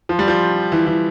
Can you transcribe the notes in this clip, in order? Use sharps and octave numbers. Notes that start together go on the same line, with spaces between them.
F3
G3
F3
E3
E3